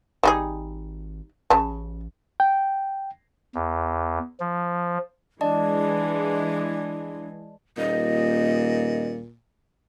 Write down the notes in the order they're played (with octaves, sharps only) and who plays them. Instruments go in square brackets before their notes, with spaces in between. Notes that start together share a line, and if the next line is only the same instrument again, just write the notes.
[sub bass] G#1 [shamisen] G3 D#4 G#4
[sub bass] A1 [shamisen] C#3 A5
[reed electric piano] G5
[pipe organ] E2
F3
[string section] E3 G#3 [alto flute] D4 [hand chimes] D5 D#5 A5
[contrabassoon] D#1 [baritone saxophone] A#2 [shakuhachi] D#5